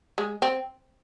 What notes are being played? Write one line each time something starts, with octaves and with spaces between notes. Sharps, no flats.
G#3
C4